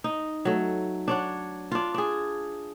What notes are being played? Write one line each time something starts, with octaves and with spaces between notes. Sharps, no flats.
D#4
F#3 A3
D4 C#5 F#5
D4 F4
D4 G#4